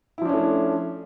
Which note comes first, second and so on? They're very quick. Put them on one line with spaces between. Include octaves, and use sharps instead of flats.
E4 F3 D4 C#4 A3